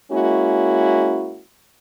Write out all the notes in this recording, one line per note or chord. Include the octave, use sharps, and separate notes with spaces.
G#3 A#3 C#4 E4 F#4